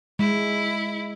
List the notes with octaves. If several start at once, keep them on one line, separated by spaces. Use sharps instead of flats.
G#3 E4